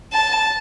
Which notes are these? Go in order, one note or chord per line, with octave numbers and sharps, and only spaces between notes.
A5